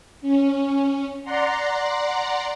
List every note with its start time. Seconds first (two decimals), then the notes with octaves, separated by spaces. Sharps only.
0.22 C#4
1.23 D5 F#5 A#5 C6